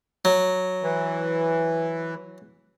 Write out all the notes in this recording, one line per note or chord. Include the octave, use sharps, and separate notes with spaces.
F#3
E3